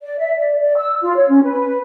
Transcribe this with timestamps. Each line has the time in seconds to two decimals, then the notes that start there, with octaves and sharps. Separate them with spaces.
0.01 D5
0.19 E5
0.37 D5
0.59 D5
0.76 E6
1.01 F4
1.15 C#5
1.28 C#4
1.44 B4